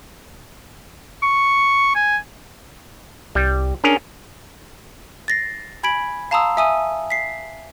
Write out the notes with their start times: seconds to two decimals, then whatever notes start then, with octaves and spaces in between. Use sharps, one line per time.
1.23 C#6
1.96 G#5
3.35 C2 G3
3.84 C#4 D4 G#4 A#4
5.28 A6 A#6 C7
5.83 G#5 B5 G#6 B6 D7 F#7
6.31 F5 A5 A#5 C6 D#6 E6
6.57 E5 G#5 D#6 E6 D#7
7.10 B6 C7